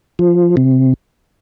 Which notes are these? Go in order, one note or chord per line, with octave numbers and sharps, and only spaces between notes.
F3
C3